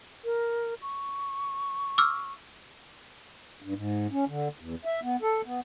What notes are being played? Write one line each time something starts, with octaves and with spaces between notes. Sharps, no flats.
A#4
C#6
D6 E6 F6
G2
G#2
C#4
D3
E2
E5
B3
A4
B3